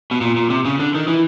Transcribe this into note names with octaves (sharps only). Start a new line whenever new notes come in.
B2
A#2
A#2
C3
C#3
D3
D#3
E3